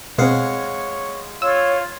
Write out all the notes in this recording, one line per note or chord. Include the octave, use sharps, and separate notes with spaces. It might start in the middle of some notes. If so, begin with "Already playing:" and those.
B2 G#3 C4 C#5 F5 F#5
F4 C#5 E6